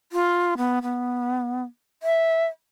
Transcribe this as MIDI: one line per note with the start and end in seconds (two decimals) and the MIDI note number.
0.12 0.54 65
0.57 0.79 59
0.82 1.63 59
2.03 2.47 76